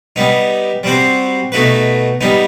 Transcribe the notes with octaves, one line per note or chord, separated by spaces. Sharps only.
G3 B3 D#4
G3 C4 F#4 C5
B2 A3 D#4 F#4 B4
G3 B3 D#4